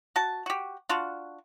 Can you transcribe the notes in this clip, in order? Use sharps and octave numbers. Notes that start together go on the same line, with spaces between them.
F#4 A5
F#4 G4
D4 F4 F#4